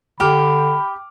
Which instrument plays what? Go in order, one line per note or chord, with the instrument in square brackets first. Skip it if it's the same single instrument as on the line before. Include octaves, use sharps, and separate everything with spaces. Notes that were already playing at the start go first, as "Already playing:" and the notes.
[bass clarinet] D3 [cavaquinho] G4 [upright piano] G5 D6 F6 [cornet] B5